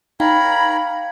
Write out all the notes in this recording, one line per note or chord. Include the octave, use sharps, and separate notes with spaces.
D#4 A#4 C#5 F5 G5 A#5 B5